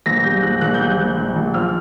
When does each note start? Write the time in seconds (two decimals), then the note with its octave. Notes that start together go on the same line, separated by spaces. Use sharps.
0.06 A#1 A#6
0.24 G3 G6
0.43 A#1 F#6
0.61 A#1 F#6
0.74 G6
0.80 G3 F#6
0.98 A#1
1.17 A#1
1.36 A#1
1.54 F3 F6